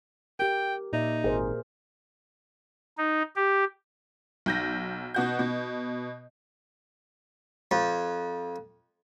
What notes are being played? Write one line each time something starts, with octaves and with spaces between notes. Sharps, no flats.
G4 A#4 G5
A#2 D#4 D5 E5
G#1 G#4 A#4 C5
D#4
G4
B1 G6 A#6
B2 F#4 G6
B2
F2